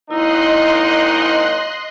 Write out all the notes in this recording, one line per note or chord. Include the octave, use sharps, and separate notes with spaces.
G#1 A#3 D#4 E4 D#5 C6 F#6